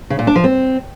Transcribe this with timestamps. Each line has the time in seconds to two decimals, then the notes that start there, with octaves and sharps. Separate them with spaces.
0.10 C#3
0.19 A#2
0.27 D4
0.36 F3
0.44 C4